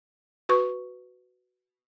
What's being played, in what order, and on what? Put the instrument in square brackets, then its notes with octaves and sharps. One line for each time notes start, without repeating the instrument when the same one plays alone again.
[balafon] F#4 B4 C#6